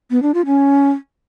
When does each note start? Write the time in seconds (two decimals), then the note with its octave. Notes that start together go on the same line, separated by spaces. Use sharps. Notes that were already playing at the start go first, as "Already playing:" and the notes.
0.10 B3
0.22 D4
0.34 F4
0.46 C#4